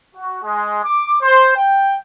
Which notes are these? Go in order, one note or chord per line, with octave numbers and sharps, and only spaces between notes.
F#4
G#3
D6
C5
G5